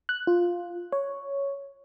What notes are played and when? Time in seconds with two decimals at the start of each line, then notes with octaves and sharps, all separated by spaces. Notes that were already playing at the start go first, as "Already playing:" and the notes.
0.09 F#6
0.27 F4
0.92 C#5